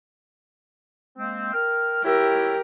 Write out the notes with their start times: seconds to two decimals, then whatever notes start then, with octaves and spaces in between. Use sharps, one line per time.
1.18 G#3 A#3 C4
1.53 A#4 G5 F6
2.04 E4 G4 A#4 C#5 E5